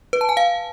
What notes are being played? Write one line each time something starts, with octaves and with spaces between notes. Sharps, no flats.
B4
A5
G#5
F5